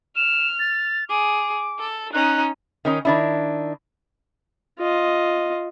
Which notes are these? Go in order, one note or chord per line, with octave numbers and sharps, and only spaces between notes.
F6 E7
A6
G#4 D6
A4
C#4 D#4 F#6
D#3 C#4 D#4
D#3 D4 E4
F4 D#5